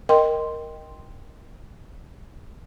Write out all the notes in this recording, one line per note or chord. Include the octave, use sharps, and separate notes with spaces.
A#4 D#5 G5 C6